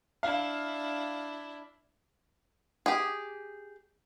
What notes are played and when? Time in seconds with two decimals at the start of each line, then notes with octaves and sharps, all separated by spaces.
0.23 D4 E4 F5
2.86 G4 G#4